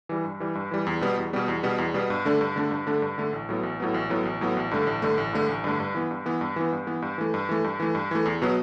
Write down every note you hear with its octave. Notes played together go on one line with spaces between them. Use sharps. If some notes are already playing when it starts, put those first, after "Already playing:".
E3 G3
G2
E3 G3
G2
E3 G3
E2
B2 G3 B3
E2
B2 G3 B3
E2
B2 G3 B3
E2
B2 G3 B3
G2
D3 A3 D4
G2
D3 A3 D4
G2
D3 A3 D4
G2
D3 A3 D4
A1
A2 F#3 B3
A1
A2 F#3 B3
A1
A2 F#3 B3
A1
A2 F#3 B3
A1
G2 D3 A3
A1
G2 D3 A3
A1
G2 D3 A3
A1
G2 D3 A3
G2
E3 B3
G2
E3 B3
G2
E3 B3
G2
E3 B3
G2
E3 A3
G2
E3 A3
G2
E3 A3
G2
E3 A3
E2
B2 F#3 B3